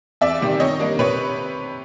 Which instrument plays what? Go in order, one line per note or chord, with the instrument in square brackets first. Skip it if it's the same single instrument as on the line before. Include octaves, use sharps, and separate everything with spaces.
[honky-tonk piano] E2 D5 E5
C3 D#3 G3
D#3 C#5 D#5
G3 A#3 D4
C3 B4 C#5